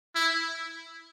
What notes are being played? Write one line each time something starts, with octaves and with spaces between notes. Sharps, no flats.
E4